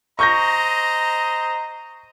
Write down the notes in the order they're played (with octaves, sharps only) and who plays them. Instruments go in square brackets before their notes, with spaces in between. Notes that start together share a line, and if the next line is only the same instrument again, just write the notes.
[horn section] C5 D#5 A#5 [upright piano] C#6 G6 A#6